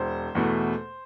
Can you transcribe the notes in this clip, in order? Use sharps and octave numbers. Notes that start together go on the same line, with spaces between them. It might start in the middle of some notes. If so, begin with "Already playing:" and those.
Already playing: E1 C5
E2 B2 A3